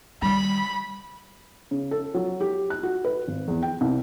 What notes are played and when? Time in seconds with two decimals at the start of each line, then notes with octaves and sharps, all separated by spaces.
0.22 D#3 G3 B5
1.71 C#3
1.91 A4
2.14 F#3
2.41 G4
2.70 F#6
2.83 F#4
3.05 B4
3.28 G#1
3.48 E2
3.63 G5
3.81 C2